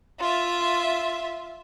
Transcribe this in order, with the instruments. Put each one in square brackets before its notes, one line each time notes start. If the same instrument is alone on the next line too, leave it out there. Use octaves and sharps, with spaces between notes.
[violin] F4 E5